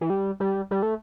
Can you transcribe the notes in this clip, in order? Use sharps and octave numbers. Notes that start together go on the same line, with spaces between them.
E3
G3
G3
G3
A3